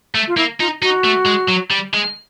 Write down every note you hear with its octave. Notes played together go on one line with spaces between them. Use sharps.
A3
F4
A#3 E4
D#4 F4
D#4 F#4
A3
G#3
F#3
G3
G#3